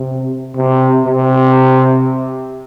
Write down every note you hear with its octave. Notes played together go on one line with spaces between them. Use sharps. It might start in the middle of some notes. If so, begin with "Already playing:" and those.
Already playing: C3
C3
C3